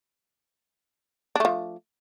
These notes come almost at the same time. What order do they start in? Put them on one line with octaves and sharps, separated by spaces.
D4 A3 F3